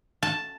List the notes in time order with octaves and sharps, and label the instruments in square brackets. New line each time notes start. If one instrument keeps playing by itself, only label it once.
[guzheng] A5